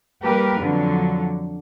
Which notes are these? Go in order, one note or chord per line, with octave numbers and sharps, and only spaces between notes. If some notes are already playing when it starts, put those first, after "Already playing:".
G3 A#3 G4 A#4 B4
F2 D3 F#3